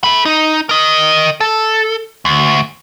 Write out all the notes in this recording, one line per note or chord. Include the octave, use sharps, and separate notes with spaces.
A4 B5
D#4
A#4 D#5
A4
D2